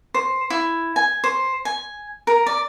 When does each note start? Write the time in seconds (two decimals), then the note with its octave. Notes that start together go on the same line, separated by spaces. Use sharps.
0.14 C5
0.50 E4
0.96 G#5
1.24 C5
1.65 G#5
2.27 A#4
2.46 D5